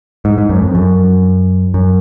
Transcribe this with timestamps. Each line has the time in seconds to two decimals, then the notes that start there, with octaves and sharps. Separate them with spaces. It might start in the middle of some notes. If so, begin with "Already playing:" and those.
0.25 G#2
0.38 G#2
0.49 F#2
0.62 F2
0.75 F#2
1.74 F#2